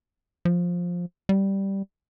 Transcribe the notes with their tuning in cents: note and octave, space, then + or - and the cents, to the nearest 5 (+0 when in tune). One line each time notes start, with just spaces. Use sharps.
F3 +10
G3 -5